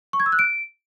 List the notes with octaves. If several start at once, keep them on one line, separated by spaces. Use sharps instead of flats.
C#6
G#6
E6
F#6
D7